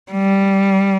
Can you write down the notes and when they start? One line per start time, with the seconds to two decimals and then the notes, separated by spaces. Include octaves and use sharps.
0.12 G3